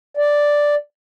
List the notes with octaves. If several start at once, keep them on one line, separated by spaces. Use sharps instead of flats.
D5